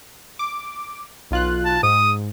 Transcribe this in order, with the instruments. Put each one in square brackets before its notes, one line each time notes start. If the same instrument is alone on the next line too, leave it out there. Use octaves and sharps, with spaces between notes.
[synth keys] D6
B1 F4 F#6
[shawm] A5
[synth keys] G#2 [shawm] D#6